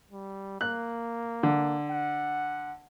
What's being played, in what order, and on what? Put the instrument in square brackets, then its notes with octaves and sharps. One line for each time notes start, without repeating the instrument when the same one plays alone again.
[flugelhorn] G3
[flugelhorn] A#3 [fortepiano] F#6
[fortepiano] D3
[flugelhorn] F#5